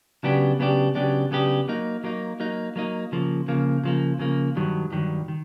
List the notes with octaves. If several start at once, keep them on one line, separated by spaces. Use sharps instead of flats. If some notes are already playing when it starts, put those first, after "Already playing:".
C#3 F#3 B3 D4 G4
C#3 F#3 B3 D4 G4
C#3 F#3 B3 D4 G4
C#3 F#3 B3 D4 G4
F#3 A#3 D#4
F#3 A#3 D#4
F#3 A#3 D#4
F#3 A#3 D#4
C#3 F3 A#3
C#3 F3 A#3
C#3 F3 A#3
C#3 F3 A#3
G2 D#3 F#3
G2 D#3 F#3
D#3